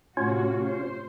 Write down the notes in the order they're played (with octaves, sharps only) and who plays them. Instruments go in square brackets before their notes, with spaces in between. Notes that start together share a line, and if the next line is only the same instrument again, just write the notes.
[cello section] A2 C3 F#4 [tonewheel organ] C#4 F4 C#5
[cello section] C5